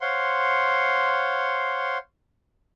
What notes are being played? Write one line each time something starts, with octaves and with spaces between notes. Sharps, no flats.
C5 C#5 F5 F#5 C6